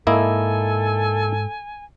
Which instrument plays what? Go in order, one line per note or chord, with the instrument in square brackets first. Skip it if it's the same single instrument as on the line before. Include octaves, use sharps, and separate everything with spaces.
[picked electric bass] G#2 [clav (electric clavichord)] A#3 E4 D#5 [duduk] A4 [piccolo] G#5